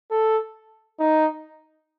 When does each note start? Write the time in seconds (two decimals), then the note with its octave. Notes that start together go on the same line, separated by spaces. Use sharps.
0.11 A4
0.99 D#4